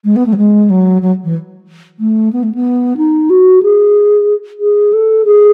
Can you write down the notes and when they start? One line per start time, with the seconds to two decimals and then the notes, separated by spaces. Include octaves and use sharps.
0.04 G#3
0.16 B3
0.26 A3
0.33 F#3
0.37 G#3
0.70 F#3
1.02 F#3
1.24 E3
2.00 A3
2.33 B3
2.43 A3
2.55 B3
2.97 D#4
3.30 F#4
3.63 G#4
4.60 G#4
4.93 A4
5.25 G#4